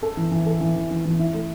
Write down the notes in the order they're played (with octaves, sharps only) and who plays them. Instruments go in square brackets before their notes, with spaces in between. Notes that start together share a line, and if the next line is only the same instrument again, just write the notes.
[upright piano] A4
E3
E3
A4
E3
E3
E3
E3
E4
A3